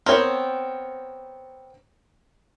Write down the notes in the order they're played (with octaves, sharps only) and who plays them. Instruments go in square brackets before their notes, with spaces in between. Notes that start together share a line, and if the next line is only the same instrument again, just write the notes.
[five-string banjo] B3 C4 [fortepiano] A#4 C#5